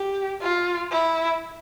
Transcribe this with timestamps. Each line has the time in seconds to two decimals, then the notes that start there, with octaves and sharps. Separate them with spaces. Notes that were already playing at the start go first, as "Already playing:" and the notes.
Already playing: G4
0.41 F4
0.92 E4